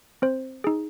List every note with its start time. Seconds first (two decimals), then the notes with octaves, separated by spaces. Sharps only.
0.22 C4 C5
0.64 D#4 G#4